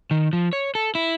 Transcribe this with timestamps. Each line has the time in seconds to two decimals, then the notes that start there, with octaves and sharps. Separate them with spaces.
0.11 D#3
0.33 F3
0.53 C#5
0.75 A4
0.95 E4